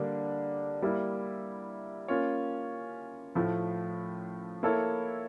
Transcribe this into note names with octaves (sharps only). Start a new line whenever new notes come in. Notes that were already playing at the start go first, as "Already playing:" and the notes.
Already playing: D3 G3 A#3 D4 A4
G3 A#3 E4
A#3 C#4 F4 C#5
A2 F3 A3
A#3 E4 A4 C#5